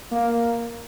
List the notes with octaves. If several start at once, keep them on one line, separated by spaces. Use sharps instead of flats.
A#3